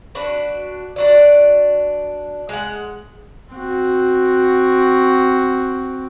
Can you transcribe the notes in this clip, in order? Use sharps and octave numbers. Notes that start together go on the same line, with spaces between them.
D4 F#4 B4
D4 F#4 D5
G#3 F#5
C4 F#4